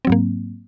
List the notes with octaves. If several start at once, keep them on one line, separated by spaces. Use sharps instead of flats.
G#2 F#3 A#3 C4